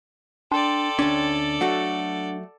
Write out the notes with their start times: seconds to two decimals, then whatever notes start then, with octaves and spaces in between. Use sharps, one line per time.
0.51 D4 A4 D5 G5 C6
0.99 D2 C#4 D4
1.61 F#3 A3 F#4 F#5